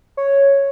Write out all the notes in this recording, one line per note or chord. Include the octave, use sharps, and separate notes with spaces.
C#5